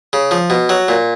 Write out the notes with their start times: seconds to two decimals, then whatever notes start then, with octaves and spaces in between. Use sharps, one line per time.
0.13 C#3
0.31 F3
0.50 B2
0.69 F#3
0.88 A#2